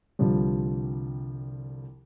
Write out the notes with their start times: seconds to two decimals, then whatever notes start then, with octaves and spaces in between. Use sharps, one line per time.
0.19 C2 D3 F3 G3